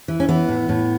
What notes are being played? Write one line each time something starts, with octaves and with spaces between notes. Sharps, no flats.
E3
C#4
E3 B3
A2
A2